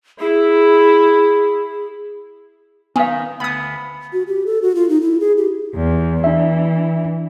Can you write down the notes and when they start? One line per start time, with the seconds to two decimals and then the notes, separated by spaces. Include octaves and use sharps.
0.20 E4 G#4
2.96 D#3 B3 F5 G#5
3.40 D2 B3 B5 D#6
4.13 F#4
4.27 G4
4.46 A4
4.62 F#4
4.75 F4
4.89 D#4
5.02 E4
5.20 G#4
5.38 G4
5.75 E2
6.24 E3 D4 E5